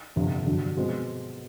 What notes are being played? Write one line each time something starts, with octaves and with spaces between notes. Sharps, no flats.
G1 F2 C3
G1 F2 D3 F#3
B2 G#3 C4